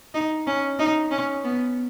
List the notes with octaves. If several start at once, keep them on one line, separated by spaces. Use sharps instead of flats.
D#4
C#4
D#4
C#4
B3